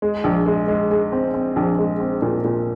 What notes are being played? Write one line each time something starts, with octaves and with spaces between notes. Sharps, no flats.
G#3
A#1
G#3
G#3
G#3
C4
C4
A#1
G#3
C4
A#2
A#2